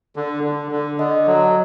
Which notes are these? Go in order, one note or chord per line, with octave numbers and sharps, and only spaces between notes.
D3
D3
D3
D3 D#5
F#3